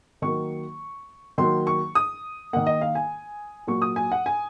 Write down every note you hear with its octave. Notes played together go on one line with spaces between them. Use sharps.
D#3 F#3 A#3 C#6
D#3 F#3 A#3 C6
C#6
D#6
D#3 A#3 F#5
D#5
F5
G#5
A#2 F#3 A#3 C#6
D#6
G#5
F#5
G#5